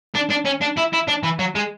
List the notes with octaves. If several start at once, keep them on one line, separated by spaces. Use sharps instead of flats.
D4
D4
C#4
D4
E4
E4
D4
E3
F#3
G#3